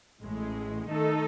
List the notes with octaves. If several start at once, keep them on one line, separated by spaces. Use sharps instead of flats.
A1 A2 G#3
D#3 A3 D#4 A4